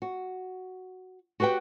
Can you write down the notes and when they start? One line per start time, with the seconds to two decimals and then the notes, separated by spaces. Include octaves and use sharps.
0.02 F#4
1.40 F#4 G4 B4 E5 G5